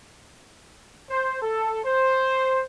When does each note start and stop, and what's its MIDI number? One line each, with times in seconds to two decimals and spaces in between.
1.10 1.39 72
1.41 1.79 69
1.85 2.61 72